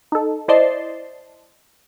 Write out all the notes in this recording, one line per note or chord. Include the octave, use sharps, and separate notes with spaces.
D#4 A4
E4 C5 D5 D#5 A5 C6